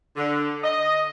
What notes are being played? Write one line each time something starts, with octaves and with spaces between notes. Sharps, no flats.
D3
D#5